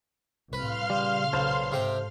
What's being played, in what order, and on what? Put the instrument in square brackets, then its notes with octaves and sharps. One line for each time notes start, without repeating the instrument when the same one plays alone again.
[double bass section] C2 A2 [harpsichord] B4 [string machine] F5 C6 F6
[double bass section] A#2 C#3 [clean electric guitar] G3
[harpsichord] B1 [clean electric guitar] A4 C5
[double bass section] G#2 [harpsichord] C3 G5